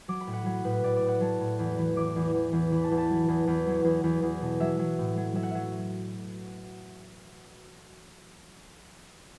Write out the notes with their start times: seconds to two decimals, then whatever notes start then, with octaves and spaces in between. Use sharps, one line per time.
0.08 F#3 D6
0.21 B5
0.27 A2
0.33 F#5
0.46 F#3
0.65 A2 B4
0.84 A2 D5
0.96 D5
1.02 A2
1.08 F#5
1.21 F#3 A5
1.40 A2
1.59 E2
1.78 E3
1.96 E3 D6
2.16 E2
2.34 E2
2.53 E2
2.72 E3 B5
2.84 A5
2.91 E2
2.98 A5
3.10 F#3
3.28 E2
3.47 E2
3.67 F#3
3.85 E2
4.04 E2
4.23 E2
4.41 B2
4.60 F#3 E5
4.79 F#3
4.98 A2
5.17 F#3
5.35 F#3 E5
5.43 F#5
5.51 F#3 E5